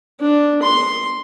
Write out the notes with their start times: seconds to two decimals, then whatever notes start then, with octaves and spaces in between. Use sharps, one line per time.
0.20 D4
0.62 C6